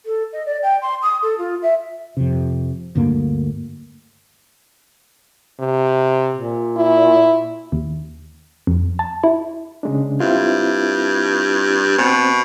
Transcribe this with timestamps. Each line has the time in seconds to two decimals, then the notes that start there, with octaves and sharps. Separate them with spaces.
0.06 A4
0.33 D#5
0.46 D5
0.63 G5
0.82 C6
1.02 D#6
1.23 A4
1.38 F4
1.62 E5
2.17 F2 C3
2.95 D2 G2 A#3
5.60 C3
6.34 A#2
6.77 E4
7.72 D#2
8.67 F2
8.99 A5
9.24 E4
9.83 C#3 G#3 D4
10.20 G2 C4 E4 F4
11.98 B2 C4